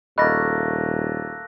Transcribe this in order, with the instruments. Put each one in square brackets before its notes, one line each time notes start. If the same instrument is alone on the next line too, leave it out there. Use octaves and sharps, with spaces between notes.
[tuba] D#1 [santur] A3 A#3 [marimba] D#5 B5 [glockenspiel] F#6 A#6